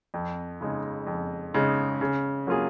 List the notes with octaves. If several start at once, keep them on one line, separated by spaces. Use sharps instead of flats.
F2
C#3 G#3 D#4
F2
C#3 G#3 D#4
C#3
F#3 A#3 F4 G#4